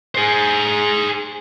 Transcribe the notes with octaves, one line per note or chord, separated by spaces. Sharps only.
G#4 C5